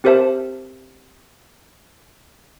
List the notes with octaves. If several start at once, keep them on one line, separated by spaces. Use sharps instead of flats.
C4 G4 A#4 C5 E5 A5